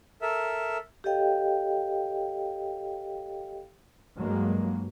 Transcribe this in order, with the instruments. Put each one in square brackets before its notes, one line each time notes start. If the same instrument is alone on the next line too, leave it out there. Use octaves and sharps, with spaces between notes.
[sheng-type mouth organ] A4 A#4 E5
[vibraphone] G4 A4 C#5 D#5 F5 G5
[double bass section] G2 F#3 G#3 A#3